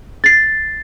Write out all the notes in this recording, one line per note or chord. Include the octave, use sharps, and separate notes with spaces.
A6 C7